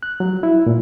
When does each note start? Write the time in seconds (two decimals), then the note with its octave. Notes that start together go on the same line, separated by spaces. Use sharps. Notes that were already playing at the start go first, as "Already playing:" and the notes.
0.03 F#6
0.20 F#3
0.43 E4
0.67 A#2